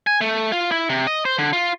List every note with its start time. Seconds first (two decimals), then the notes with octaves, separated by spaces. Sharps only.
0.07 G#5
0.21 A3
0.52 F4
0.72 E4
0.89 C3
1.07 D#5
1.25 C5
1.38 D3
1.53 F4